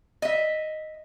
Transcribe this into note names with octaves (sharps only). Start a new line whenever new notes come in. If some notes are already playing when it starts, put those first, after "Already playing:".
D#5 E5